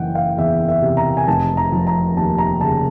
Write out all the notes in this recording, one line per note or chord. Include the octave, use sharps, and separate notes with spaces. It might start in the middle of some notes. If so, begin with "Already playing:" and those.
Already playing: F#1 E3 F#5 G5
F5
E2 E5
E5
C3
A#5
G#5
F1 A5
A#5
F3
A#5
D#2 A5
A#5
C#3 A5